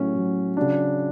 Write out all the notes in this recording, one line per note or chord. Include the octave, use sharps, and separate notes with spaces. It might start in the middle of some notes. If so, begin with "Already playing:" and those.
Already playing: A2 F#3 C#4
A2 F#3
C#3 F#3 D4